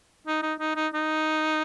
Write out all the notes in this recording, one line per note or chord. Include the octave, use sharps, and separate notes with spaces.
D#4
D#4
D#4
D#4
D#4